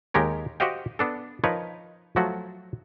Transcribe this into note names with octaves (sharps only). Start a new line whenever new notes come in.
D#2 G#3 G4 A#4 C#5
F#4 G4 C5 D#5 F5 G5
B3 D4 A4
F3 D#4 A#4 B4 C#5
F3 F#3 A3 F#4